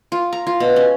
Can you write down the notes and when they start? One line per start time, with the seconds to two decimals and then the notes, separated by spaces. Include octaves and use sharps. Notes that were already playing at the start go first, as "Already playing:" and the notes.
0.12 F4
0.33 A#5
0.47 F4
0.60 B2
0.76 C#4